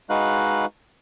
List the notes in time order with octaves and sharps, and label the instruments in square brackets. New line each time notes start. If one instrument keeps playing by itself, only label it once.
[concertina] G#3 D#4 F#4 B4 F5 F#6